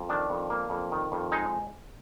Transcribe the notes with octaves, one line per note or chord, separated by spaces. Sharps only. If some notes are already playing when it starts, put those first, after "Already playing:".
Already playing: F2
D#3 D4
F2
A#3
F2
D#3
F2
G#3 D#4